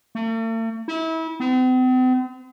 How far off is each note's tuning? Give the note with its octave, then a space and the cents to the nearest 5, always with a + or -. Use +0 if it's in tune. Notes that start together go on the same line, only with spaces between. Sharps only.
A3 +45
E4 -30
C4 -45